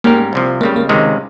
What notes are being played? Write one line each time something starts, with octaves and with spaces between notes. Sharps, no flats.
G#2 G3 A#3 C#4 G4 A#4
C2 C3 F3
C#2 C#3 G3 A#3
A#3
C#2 C3 D#3 G#3